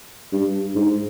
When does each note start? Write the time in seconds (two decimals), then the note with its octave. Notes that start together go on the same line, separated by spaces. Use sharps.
0.33 G2
0.75 G#2